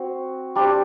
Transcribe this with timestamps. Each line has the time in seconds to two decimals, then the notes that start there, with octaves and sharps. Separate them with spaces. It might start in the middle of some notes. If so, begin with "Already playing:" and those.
Already playing: C4 F#4 C5
0.55 G3 D4 G4 C5